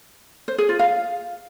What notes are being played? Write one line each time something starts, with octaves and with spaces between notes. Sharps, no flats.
C5
G#4
F4
F5